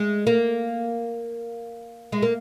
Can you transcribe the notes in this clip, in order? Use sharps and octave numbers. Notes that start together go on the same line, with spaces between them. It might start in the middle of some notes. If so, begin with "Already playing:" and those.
Already playing: G#3
A#3
G#3
A#3